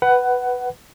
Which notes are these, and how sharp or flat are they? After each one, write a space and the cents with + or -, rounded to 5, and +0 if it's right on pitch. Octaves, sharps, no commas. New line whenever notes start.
B4 +0 F#5 +15